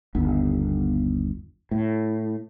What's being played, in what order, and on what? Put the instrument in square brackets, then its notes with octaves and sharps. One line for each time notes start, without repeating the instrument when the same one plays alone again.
[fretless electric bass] G1 D#2 B3
A2